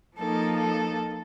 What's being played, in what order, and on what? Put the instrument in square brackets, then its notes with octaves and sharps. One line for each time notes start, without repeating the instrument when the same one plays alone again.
[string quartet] F3 A#3 D#4 A4
A4